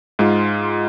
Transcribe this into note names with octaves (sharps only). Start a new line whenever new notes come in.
G#2 G#3 F4